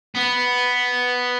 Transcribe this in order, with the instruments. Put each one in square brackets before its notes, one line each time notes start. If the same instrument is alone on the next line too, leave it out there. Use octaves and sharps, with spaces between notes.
[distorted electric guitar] B3